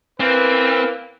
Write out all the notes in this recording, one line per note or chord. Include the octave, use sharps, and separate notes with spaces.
E3 A#3 C4 B4